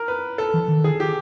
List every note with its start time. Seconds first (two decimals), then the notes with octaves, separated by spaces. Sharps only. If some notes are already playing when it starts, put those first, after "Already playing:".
Already playing: A#4
0.08 B4
0.38 A4
0.54 E3
0.68 D#3
0.84 G#4
1.00 G4